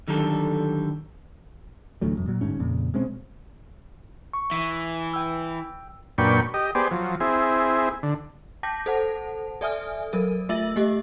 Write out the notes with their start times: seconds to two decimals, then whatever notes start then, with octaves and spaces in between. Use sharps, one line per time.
0.08 D3 D#3 F#3 G3 A4
2.01 A1 D2 F#3 A3
2.16 E1 F#2
2.28 A#2 F#3
2.41 G1 G#2 C#4
2.60 F2 A#2 C#3
2.94 B2 G#3 C4 C#4
4.33 C#6
4.51 E3 B6
5.14 G5 E6
6.18 F#2 A#2 D4 B4 G5 C#6
6.54 G4 D#5
6.75 B3 G4 G#4 C5 D5
6.91 F3 F#3
7.20 C4 E4 G#4
8.03 D3
8.63 G5 A5 D6 G6 A#6 B6
8.86 A4 C5 F#5 A5
9.61 A4 D5 E5 G#5 D#6 F6
10.13 F#3 A4 A#4
10.49 A3 F4 E5 E6 A6 F#7
10.76 A3 G4 D#5